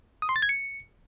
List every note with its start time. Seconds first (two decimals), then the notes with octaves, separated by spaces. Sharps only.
0.22 D#6
0.29 C6
0.36 A6
0.42 G#6
0.49 C#7